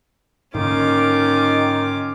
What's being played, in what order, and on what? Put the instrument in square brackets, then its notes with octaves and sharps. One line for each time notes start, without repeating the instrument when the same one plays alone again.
[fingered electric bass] G#2 D3 A#3 [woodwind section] D#3 D#4 F4 [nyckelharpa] C#4 D6